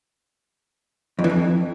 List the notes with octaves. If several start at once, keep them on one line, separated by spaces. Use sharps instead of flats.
F2
E3
F2